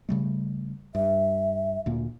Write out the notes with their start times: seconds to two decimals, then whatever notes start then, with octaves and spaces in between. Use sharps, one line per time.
0.09 C#3 G3 A3
0.95 G2 E5
1.86 D2 A#2 A#3